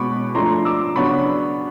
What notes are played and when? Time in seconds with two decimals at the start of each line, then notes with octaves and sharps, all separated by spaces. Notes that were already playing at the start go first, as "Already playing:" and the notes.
Already playing: B2 G#3 B3 B5 C#6 D6
0.35 F3 A3 D4 A#5 C6
0.65 D6 E6
0.96 C#3 F#3 B3 D4 B5 C#6